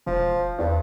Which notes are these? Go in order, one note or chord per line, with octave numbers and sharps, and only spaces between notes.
E1 F3
E2 G2